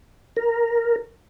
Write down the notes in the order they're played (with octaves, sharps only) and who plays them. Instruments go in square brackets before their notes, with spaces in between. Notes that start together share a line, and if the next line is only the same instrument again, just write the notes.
[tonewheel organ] A#4